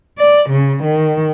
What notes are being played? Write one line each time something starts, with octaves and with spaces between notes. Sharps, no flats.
D5
C#3
D#3